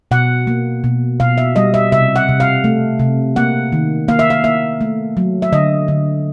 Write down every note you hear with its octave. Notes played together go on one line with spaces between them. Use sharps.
B2 F#5
A#3
B2
B2 F5
E5
G3 D#5
E5
C3 E5
F#5
C3
F5
A3
C3
A#3 F#5
D#3
A#3 F5
E5
F5
A#3 E5
A3
F#3
E5
D3 D#5
D3